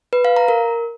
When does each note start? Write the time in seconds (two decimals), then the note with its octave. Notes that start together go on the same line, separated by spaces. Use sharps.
0.13 B4
0.25 F5
0.36 A#5
0.48 A#4